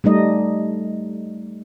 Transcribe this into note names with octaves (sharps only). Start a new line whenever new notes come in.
G3 A3 D#4 D#5